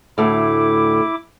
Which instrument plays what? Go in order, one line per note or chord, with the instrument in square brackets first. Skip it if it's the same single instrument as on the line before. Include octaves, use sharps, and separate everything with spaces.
[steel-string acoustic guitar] D2 A2 [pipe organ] E4 D6